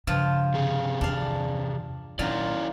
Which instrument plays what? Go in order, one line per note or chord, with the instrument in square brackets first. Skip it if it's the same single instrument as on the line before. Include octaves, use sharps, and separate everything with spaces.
[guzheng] G2 F3 F4 [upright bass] C#3
[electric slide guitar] C3 G#4
[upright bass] E2 [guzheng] D4 F5
[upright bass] A#2 [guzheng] D#3 F#3 F4 [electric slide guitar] C#4 E4 D5